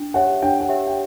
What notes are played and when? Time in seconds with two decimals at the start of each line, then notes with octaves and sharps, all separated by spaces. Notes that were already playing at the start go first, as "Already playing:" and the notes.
Already playing: D4
0.14 G4 C#5 E5 F#5
0.42 D4 G5
0.60 F#5
0.69 G4 C#5 E5
0.87 G5